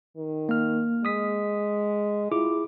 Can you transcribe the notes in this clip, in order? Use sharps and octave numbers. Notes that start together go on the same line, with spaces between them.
D#3
A#3 F6
G#3 D#6 B6
E4 F4 G#4 D6